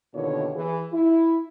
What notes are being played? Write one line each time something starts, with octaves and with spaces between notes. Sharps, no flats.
D#2 B2 D3 D#3 F4 C#5
E3 G#4
E4